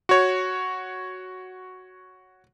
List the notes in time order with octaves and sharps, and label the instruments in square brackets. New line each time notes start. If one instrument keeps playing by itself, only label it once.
[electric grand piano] F#4 C#5